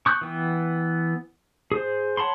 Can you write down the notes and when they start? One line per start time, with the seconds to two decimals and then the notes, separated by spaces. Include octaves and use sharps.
0.06 C#6 D#6 F#6 G6
0.21 E3 B3 G5
1.72 G#4 C5
2.17 C#5 F#5 A5 B5 C6